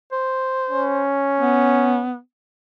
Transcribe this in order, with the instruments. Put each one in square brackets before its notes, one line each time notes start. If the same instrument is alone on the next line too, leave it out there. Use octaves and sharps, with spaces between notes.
[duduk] C5
[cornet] C#4
[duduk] B3